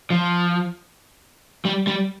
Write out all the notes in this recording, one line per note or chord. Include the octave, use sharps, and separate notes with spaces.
F3
G3
G3